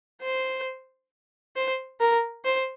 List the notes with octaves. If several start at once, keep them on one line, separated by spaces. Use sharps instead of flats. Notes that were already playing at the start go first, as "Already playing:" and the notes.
C5
C5
A#4
C5